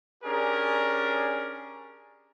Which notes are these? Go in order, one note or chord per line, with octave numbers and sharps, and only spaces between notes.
C#4 D4 G4 G#4 A#4 D5